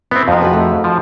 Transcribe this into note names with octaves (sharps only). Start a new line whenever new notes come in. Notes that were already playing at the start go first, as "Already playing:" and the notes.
B3 C4 E4 C#5
F2 F3 F#3 D#4
F#4 G#4 B4
A3
F3